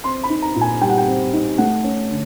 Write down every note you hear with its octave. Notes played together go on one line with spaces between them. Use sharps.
C4 C6
B5
D#4
A#5
A#2
G#5
G3 G5
F#5
G5
C4
D#4
A3 F#5
C#4
D3